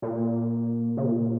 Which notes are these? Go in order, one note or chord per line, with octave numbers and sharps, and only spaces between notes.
A#2
C#3
A#2